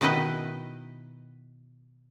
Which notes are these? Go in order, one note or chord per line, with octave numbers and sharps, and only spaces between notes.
B2 D#3 D#4 E4 B4 D#5